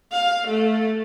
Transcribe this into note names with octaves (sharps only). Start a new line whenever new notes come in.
F5
A3